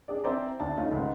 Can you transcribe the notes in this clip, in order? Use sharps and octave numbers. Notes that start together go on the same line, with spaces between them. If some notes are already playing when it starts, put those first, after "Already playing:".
D4 G#4 D5
C4 E4 C5 D5 A#5
D2 D4 A5
A3 C#4 D#4 F4
C#2 G#2